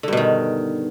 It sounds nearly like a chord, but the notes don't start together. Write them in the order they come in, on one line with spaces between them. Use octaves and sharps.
D3 G2 B2 D#3